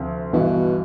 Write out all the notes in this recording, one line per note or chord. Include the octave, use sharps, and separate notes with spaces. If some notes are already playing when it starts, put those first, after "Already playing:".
Already playing: D2 C3 F3
G1 G2 B2 E3